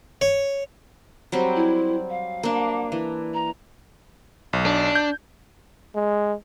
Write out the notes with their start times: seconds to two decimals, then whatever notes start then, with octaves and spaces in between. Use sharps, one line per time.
0.21 C#5
1.32 F#3 G3 C4
1.55 E4
2.10 F5
2.43 A#3 D4
2.92 E3
3.34 A#5
4.53 B1
4.66 D4
4.95 G6
5.95 G#3